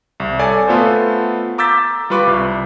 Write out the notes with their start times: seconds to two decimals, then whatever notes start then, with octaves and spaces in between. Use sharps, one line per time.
0.20 C2
0.39 A4 C#5 D5 G#5
0.68 A3 B3 F4 A4 C5
1.58 A#5 D6 E6 G6 A6 B6
2.10 G3 F4 B4 C#6 D6
2.27 C2